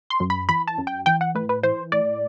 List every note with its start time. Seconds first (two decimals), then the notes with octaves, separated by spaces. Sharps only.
0.10 C6
0.20 F#2
0.30 B5
0.49 E3 B5
0.67 A5
0.78 F#2
0.87 G5
1.06 E3 G5
1.21 F#5
1.35 A2 B4
1.49 B4
1.63 E3 C5
1.92 A2 D5